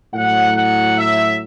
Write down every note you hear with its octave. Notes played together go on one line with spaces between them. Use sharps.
A2 F#3 F#5
F#5
E5